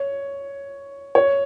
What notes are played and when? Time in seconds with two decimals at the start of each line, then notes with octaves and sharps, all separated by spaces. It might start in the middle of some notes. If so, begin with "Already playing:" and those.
Already playing: C#5
1.15 C#5